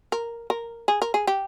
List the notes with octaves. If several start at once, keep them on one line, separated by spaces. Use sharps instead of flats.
A#4
A#4
G#4
A#4
G#4
G4